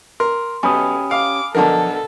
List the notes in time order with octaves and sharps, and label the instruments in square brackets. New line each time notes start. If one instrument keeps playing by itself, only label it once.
[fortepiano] A#4 [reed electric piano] C6
[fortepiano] B1 [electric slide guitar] C#4 G4 [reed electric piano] G#5 B5 D#6
[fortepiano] F5 [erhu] D6
[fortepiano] B1 D3 A#4 [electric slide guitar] F3 A5 [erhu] A4